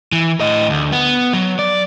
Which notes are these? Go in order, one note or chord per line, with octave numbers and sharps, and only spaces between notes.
E3
A2 D#5
D2
B3
F#3
D5